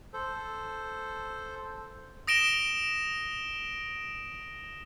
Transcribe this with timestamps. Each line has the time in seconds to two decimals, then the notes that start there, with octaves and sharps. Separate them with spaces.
0.13 A4 C5
2.27 D#6 A#6 D7 E7 G7